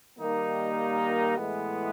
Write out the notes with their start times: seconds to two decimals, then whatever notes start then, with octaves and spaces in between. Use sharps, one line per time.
0.19 D#3 G3 A#3 D#4
1.37 A2 E3 G#3 B3